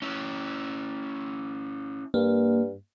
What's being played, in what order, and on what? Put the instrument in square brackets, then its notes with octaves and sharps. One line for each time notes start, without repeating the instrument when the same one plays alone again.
[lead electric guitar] C#4 E4
[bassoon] G2 [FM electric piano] A#3